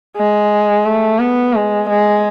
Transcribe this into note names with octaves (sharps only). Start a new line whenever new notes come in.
G#3
A3
B3
G#3
G#3